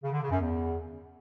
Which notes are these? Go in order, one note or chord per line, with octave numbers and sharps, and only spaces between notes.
C#3
D3
C#3
F#2
E2